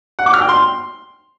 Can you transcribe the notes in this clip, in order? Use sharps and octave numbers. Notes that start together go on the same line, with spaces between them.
F#5
D6
F6
G5
C6